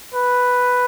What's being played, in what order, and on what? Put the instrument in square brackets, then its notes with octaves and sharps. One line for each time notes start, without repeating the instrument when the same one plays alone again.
[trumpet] B4